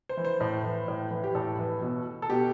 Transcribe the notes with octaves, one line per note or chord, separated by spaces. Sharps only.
C5
E3
C5
A2
E3
A2
E3
G4
A2 A4
E3
B2
A4
B2 G4